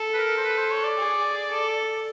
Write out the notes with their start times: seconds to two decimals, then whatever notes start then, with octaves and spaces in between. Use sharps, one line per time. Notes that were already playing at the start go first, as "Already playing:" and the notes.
Already playing: A4
0.14 B4
0.17 A#4
0.37 C5
0.44 B4
0.57 C5
0.71 C#5
0.84 D5
0.98 G#4
1.50 A4